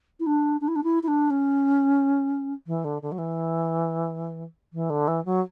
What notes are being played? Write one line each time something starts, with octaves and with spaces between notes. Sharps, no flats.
E4
D4
D4
E4
D4
E4
E4
D4
C#4
E3
D3
D3
F#3
E3
E3
D3
E3
F#3